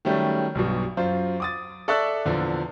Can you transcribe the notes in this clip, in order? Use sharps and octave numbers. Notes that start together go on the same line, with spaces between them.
D#3 F#3 G3 A3 C#4
B1 G2 B2
F#2 F4 C5
D6 D#6 A6
A4 D5 E5 C#6 E6 F#6
E2 A#2 D3 F3